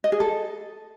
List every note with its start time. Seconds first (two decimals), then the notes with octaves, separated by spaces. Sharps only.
0.04 D#5
0.12 G#4
0.20 A4